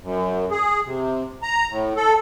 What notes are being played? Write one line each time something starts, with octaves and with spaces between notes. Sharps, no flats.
F#2
G#4
C3
A#5
A2
A4